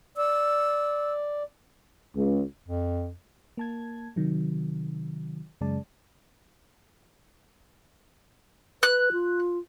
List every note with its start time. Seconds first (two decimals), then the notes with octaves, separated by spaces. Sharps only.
0.17 D5 E6
2.16 C#2
2.68 F2
3.57 A#3 A5 G#6
4.16 C3 D#3 F#3
5.61 F#2 C#3 G#3 D5 A5
8.83 B4 F#6
9.12 F4